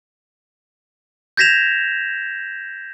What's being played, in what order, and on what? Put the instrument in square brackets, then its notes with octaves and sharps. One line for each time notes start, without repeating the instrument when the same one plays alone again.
[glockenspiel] G6 G#6 A#6 B6 E7 F7